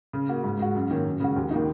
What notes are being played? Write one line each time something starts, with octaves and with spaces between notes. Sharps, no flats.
C#3
A#3 F#4
G#2
G#3 F#4
F#2
D#3 A#3 C#4
F#2
C#3 G#3 F#4
D#2
D#3 A#3 D#4